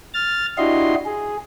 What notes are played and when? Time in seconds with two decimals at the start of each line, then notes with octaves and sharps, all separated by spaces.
0.14 F6 A6
0.58 D4 E4 F#4 G4 D#5 C6
1.06 G#4